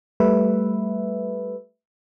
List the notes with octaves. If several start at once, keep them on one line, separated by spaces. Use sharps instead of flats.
G3 A3 B4 E5